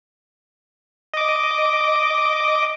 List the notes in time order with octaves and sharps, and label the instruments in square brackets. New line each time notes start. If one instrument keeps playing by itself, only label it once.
[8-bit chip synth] D#5 D6